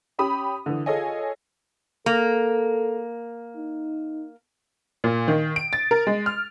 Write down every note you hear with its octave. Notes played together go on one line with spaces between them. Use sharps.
C#4 G4 B5 D#6
D3 E3
F4 G#4 A4 C#5 D#5 G#5
A#3 A4
D#4
A#2
D#3
D7
A6
A#4
G#3
F6